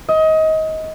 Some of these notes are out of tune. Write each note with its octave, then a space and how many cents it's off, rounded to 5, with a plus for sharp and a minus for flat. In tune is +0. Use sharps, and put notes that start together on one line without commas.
D#5 +25